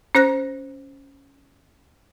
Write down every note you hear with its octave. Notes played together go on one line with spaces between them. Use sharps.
C#4 C5 F#6 A#6